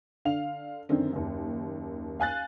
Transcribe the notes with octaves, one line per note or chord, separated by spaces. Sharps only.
D3 F5 F7
F#2 D3 D#3 C4
F#1 D#2
F5 G#5 F#6 A6